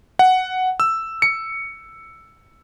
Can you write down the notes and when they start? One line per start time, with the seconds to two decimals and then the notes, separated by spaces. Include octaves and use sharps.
0.19 F#5
0.80 E6
1.22 C#7